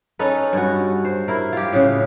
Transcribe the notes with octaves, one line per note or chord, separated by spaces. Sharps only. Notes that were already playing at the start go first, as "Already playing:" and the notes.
C#4 D#4 A4 B4
G2 C#4 F#4
C5
E4 A#4
F4 G4
A2 C#3